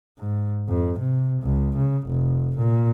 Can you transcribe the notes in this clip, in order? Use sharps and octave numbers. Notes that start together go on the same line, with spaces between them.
G#2
F2
C3
C#2
C#3
F1
A#2